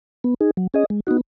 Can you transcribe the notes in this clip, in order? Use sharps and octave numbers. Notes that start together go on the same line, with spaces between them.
B3
D#4 G#4
F#3
C#4 G#4 D#5
G#3
B3 D#4 F#4